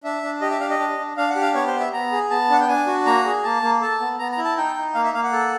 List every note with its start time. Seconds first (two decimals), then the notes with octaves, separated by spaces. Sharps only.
0.04 D4 E5
0.23 D4
0.41 G4 D#5
0.51 E5
0.60 D4 F5
0.70 D#5
0.79 D4
0.98 D4
1.17 D4 F5
1.30 F#5
1.36 G4
1.42 F5
1.54 B3 C#5
1.68 C5
1.73 B3
1.80 E5
1.92 B3 A#5
2.12 G#4
2.30 B3 A5
2.50 D4 F#5
2.60 G5
2.68 D4 G#5
2.87 F#4
3.06 A#3 A#5
3.25 G#4
3.44 A#3 A5
3.62 A#3
3.81 A4 A5
4.00 B3
4.19 B3 A#5
4.32 A#5
4.38 E4
4.45 A5
4.57 D#4 G5
4.76 D#4
4.95 A#3 F5
5.04 E5
5.14 A#3 F5
5.23 F#5
5.32 A4